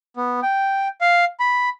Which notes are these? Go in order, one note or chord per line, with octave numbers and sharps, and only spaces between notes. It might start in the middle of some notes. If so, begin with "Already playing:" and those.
B3
G5
F5
B5